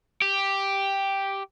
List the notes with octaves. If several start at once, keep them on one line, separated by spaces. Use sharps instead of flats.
G4